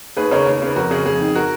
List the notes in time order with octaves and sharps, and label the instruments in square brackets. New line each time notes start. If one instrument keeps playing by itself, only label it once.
[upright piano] D#2 G#4 B4
C#3 A#4 C#5
D#2
C#3 B4
F2 F#4 A#4
C#3 G#4
F2 G#4
D#3
F#4 A#4